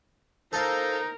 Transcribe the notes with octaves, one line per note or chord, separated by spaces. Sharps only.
D#4 A4 A#4 C5 F5